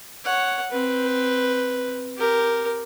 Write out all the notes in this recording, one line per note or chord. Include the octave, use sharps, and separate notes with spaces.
C#5 F#5
C4 B4
G4 A#4